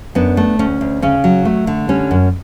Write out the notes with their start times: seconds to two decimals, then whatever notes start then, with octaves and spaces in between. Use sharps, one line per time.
0.15 F#2 B3 D4
0.37 A3
0.59 D2 C#4
0.81 D2
1.02 C#3 C#4
1.24 F#3
1.45 A3
1.67 D3
1.89 G3 C#4
2.11 F#2